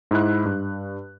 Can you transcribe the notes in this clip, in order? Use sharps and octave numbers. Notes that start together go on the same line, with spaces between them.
G#2 E4 F#6
G2